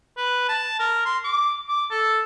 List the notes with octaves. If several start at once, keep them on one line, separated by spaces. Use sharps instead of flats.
B4
A5
A#4
C6
D6
D6
A4